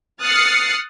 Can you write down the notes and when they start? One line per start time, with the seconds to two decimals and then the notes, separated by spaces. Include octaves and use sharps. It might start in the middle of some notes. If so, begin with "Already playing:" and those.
0.22 D#6 F6 F#6 A6 C7 C#7